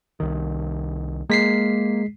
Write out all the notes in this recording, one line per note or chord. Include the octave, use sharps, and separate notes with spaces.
C2 D#3
G#3 A#3 B6 C7